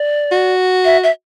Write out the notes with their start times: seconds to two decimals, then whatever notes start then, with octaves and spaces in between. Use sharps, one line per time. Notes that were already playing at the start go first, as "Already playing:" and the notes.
Already playing: D5
0.32 F#4
0.85 E5
1.03 E5